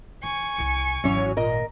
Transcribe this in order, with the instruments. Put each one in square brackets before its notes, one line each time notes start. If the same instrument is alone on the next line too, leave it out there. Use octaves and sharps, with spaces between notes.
[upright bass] E3 [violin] G#5 C#6
[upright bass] C2 E4
[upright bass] G#1 D3 [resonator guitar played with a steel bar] E3 C#4 C#5 [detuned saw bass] F#3
[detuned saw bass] A#2 [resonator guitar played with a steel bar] A#4 D#5